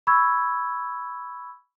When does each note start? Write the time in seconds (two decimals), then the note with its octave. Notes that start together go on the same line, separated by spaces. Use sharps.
0.07 B5 C#6 E6 G#6